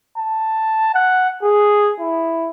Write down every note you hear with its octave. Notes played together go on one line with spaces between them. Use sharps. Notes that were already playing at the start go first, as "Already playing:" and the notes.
A5
F#5
G#4
E4